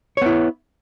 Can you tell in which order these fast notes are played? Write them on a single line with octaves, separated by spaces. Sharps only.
C#5 B3 E4